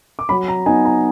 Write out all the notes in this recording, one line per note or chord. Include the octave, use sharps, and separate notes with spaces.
D6
F#3 B5
A#5
B3 D#4 G#5
A#5